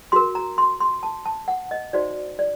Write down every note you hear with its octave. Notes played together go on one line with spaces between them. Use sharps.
F#4 A#4 C6
A#5
C6
C6
A5
A5
F#5
D#5
D#4 F#4 C5 D5
D5